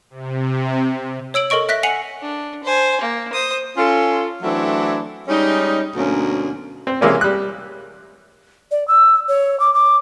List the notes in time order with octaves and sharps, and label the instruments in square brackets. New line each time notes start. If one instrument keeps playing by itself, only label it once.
[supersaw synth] C3
[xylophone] C#5 E6 D7 F#7
A4 A#4 D#5 C#6 D7
E5 F#6 A#6 B6
F#5 G#5 C7 C#7 F7 F#7
[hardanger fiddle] D4
C5 G#5
A#3
C5 D#6
[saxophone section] C#4 F4 A4
E3 F#3 A3 C4 D4 E4
G3 G#3 C#4 D#4
D2 B2 F#3 A#3 C#4
[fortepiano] C4
C3 E3 G#3 A#3 C#4
G3 F#6
[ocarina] D5
E6
C#5
D6
D6